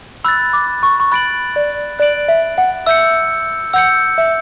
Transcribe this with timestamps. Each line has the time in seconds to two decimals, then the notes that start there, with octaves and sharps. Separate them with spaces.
0.24 B5 E6 F#6 A6
0.53 D6
0.83 C#6
1.00 C#6
1.12 B5 F#6 A6 D7 F#7
1.56 D5
1.99 D5 F#6 A6 D7 F#7
2.28 E5
2.58 F#5
2.86 E5 E6 G6 C#7
3.73 F#5 E6 G6 C#7
4.18 E5